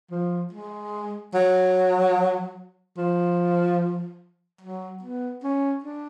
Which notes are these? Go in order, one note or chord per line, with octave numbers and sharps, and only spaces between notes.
F3
G#3
F#3
F3
F#3
B3
C#4
D4